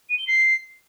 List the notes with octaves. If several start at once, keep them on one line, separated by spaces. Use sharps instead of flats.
D#7
G7
C7